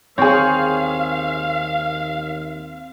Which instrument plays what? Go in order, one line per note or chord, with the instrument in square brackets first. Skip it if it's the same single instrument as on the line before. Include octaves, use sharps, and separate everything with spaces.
[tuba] D#2 [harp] C4 [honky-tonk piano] G#4 C#5 [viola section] F5